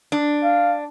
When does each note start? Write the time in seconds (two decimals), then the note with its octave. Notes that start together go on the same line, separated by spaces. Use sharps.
0.12 D4
0.44 F5